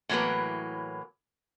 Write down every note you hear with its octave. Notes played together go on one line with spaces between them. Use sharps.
A2 E3 F#3 A#3 B4